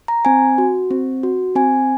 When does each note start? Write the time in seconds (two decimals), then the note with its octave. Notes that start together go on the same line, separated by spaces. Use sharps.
0.08 A#5
0.25 C4 G#5
0.58 F#4
0.91 C4
1.23 F#4
1.56 C4 G#5